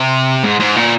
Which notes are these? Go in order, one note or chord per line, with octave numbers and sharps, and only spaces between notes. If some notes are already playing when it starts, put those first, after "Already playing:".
Already playing: C3
G#2
G#2
A#2